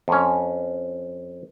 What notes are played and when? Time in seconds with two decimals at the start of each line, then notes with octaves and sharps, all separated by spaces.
0.08 F2 C#4